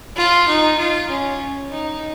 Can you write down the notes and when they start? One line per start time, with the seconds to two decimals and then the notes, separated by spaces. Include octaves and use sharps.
0.17 F4
0.48 D#4
0.78 F4
1.09 C#4
1.70 D#4